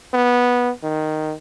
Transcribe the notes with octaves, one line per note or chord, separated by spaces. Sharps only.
B3
D#3